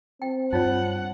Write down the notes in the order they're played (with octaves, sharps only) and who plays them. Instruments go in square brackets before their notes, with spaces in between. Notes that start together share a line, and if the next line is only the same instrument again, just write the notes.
[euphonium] C4 [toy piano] G5
[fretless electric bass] G2 [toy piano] D#4 F4 C#5 [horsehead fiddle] F#5